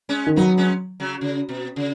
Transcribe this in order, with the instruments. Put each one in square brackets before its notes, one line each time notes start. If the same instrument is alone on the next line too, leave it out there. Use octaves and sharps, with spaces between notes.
[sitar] G#3 C#4
[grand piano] D#3
[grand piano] F#3 [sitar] B3 D#4
[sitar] G#3 C#4
C#3 F#3
C#3
B2
C#3